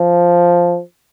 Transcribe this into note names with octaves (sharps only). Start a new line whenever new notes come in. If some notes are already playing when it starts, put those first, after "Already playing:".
Already playing: F3